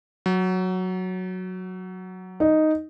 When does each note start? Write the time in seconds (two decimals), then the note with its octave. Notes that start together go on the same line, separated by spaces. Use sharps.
0.26 F#3
2.40 D#4